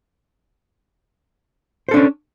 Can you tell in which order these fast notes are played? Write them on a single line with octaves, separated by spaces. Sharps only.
C5 A4 D4 C#4